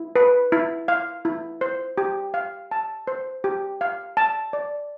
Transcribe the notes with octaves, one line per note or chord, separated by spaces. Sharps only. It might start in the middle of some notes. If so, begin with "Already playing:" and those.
Already playing: E4
B4
E4
F5
E4
C5
G4
F5
A5
C5
G4
F5
A5
D5